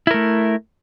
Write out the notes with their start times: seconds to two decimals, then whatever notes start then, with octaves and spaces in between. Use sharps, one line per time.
0.07 E4
0.11 A#4
0.14 A3